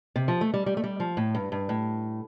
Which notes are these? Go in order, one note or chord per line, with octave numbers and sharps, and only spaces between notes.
C3
F3
A3
G3
G3
A3
G3
F3
A2
G2
G2
A2